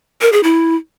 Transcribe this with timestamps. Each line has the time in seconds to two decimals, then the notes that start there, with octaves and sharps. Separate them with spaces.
0.21 A#4
0.32 G#4
0.43 E4